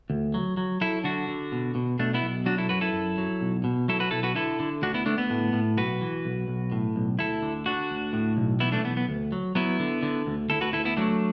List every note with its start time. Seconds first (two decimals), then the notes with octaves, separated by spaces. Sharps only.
0.10 D2
0.34 F#3
0.57 F#3
0.81 F#3 E4 A4
1.04 D3 D4 F#4
1.28 D3
1.52 B2
1.75 B2
1.99 B2 A3 D4
2.14 B3 E4
2.22 B1
2.46 F#3 D4 F#4
2.58 E4 A4
2.69 F#2 F#4 B4
2.81 E4 A4
2.93 F#2
3.18 F#3
3.41 B1
3.64 B2
3.88 F#3 E4 A4
4.00 F#4 B4
4.11 B1 E4 A4
4.23 F#4 B4
4.35 D3 E4 A4
4.60 D3
4.82 D2 D4 F#4
4.94 B3 E4
5.06 D2 A3 D4
5.18 B3
5.30 A2
5.53 A2
5.77 B1 F#4 B4
6.01 E3
6.25 B1
6.48 B1
6.72 A2
6.96 B1
7.19 D2 E4 A4
7.42 D3
7.66 D3 D4 F#4
7.90 D2
8.13 A2
8.37 B1
8.60 E3 B3 E4
8.72 A3 D4
8.84 B1 B3
8.97 B3
9.09 D2
9.32 F#3
9.55 F#3 B3 E4
9.80 D3
10.03 D3
10.27 D2
10.50 D2 E4 A4
10.61 F#4 B4
10.73 D2 E4 A4
10.85 B3 E4
10.97 F#3 A3 D4